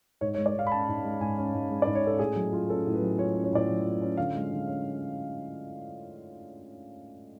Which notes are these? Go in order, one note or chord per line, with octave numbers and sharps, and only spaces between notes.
G#2 C#5
C#5
G#3
D5
G#2 F5
B5
C#4 A5
G#2
G#3
G#2 G#5
C#4
G#2
G#3
D5
G#2
C#5
C#4 A4
A2 G#4
F#3
F4
C#4 A4
A2
B4
F#3
F4 C#5
C#4
C#5
A2 D5
F#3
F4
C#4
D3 F5
G#3
D3
C#4